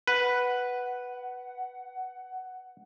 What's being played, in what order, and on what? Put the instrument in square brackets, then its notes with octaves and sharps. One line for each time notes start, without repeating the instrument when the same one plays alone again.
[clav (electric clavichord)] B4 [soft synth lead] F#5